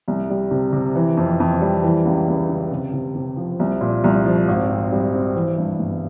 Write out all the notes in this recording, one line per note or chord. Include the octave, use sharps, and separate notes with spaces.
C2
G3
C3
C3
E3
F2
F2
G3
E3
C#2
C#2
C#3
C3
C3
C3
F3
C2
A#2
C2
F3
G#1
C4
G3
C4
E3
G2
G1